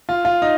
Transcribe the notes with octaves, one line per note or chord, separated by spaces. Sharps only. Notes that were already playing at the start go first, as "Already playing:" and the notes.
F4
F4
D#4